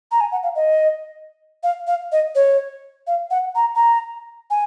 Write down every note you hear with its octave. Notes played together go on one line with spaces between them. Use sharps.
A#5
G#5
F#5
F5
D#5
F5
F5
D#5
C#5
F5
F#5
A#5
A#5
G#5